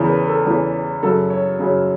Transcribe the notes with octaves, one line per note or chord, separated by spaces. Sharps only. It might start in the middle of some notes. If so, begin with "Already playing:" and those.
Already playing: E2 C#3 E3
B4
A4
E2 C#3 E3
F#2 C#3 F#3 A4
C#5
F#2 C#3 F#3